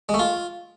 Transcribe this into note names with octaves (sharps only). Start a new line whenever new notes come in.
G#3
A3
F4